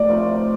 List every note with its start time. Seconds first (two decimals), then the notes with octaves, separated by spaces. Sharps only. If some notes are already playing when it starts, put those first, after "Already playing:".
Already playing: A2 D5
0.09 C3 F3 A3 D#4